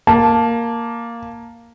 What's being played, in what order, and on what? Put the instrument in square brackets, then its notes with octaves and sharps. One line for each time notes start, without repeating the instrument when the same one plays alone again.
[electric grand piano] A#3 [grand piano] A5